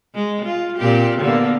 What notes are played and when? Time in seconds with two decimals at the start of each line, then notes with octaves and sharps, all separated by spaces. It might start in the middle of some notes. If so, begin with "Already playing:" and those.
0.15 G#3
0.45 F4
0.78 A#2 C4 G4
1.20 D3 A#3 B3